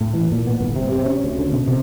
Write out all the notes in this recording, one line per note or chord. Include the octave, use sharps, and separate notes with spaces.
A2
E3
A#2
B3
G1
C3
C3
C#4
D2
D3
B2
C3